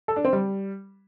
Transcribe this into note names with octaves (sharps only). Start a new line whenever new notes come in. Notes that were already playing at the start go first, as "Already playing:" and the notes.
A4
D4
C4
G3